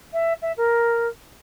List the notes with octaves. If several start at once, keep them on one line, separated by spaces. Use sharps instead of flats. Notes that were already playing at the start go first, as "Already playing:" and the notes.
E5
E5
A#4